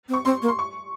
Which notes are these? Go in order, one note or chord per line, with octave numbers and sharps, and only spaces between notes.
C4
C#6
C4 C6
A#3
C6
C#6